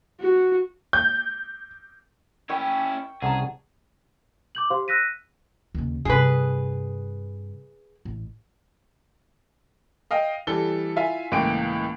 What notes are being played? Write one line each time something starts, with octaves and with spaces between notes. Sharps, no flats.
F#4
G6
C#4 E4 G5 C#6
C2 C#3 G#4 F#5 A5 A#5
D6 G6 F#7
G4 C5 F5 C6
E6 F#6 A#6 B6 D#7
D#2 C#3
G2 C3 G#4 B4
A1
D#5 F5 G5
E3 G3 A4 G7
E4 F4 E5 F5 G#5
C#2 A2 E3 A#3 G5 D7